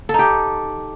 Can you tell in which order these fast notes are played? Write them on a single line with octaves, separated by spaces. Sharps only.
A4 D#4 G4